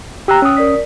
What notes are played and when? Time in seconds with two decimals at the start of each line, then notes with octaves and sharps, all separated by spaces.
0.28 G4 G5 A#5 E6 F#6
0.42 C#4 D#6
0.57 A#4 D5 B6